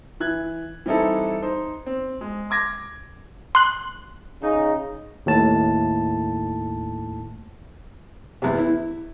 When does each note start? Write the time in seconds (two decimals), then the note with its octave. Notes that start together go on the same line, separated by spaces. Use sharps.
0.20 E3 F#6 G#6
0.86 E3 G3 C4 D#4 E4 A4
1.42 D#4 C5
1.86 C4
2.21 G#3
2.50 C6 D6 G#6 A#6
3.55 C6 F#6
4.42 C#3 D#4
5.26 D#2 A2 A5
8.42 E2 C3
8.58 E4